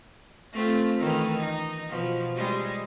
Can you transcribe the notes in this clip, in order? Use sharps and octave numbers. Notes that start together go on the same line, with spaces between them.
A3 C4 F4
D#3 E3 A3
D#4
B2 F3
G3 G#3